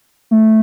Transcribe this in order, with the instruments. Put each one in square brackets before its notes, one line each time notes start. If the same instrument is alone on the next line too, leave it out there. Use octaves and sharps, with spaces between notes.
[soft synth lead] A3